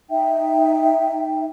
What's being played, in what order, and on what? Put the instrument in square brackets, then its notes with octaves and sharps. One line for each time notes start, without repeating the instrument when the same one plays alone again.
[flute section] D#4 E5 G5